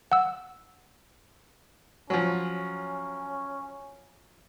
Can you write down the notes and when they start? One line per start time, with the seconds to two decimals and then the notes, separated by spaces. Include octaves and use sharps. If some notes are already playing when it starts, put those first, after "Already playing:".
0.12 F#5 E6
2.10 F3 F#3 C#4